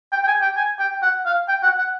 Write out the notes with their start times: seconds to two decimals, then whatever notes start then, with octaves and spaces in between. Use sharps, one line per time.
0.12 G5
0.23 G5
0.27 G#5
0.42 G5
0.56 G#5
0.79 G5
1.02 F#5
1.26 F5
1.48 G5
1.63 F#5
1.78 F#5